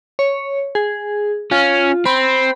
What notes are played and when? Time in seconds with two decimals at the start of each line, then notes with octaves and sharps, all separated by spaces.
0.19 C#5
0.75 G#4
1.51 C#4 F4
2.06 C4 B5